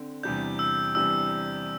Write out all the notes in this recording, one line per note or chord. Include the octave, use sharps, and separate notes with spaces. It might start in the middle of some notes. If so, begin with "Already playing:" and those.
Already playing: D3 C4
E2 C3 G3 D4 G6
E6
E2 C3 G3 D4 E6